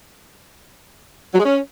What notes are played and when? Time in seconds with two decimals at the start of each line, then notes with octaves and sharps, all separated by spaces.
1.34 F#3
1.39 G#3
1.44 C#4